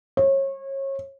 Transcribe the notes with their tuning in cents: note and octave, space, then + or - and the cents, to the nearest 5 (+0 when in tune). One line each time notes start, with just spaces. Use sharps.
C#5 -30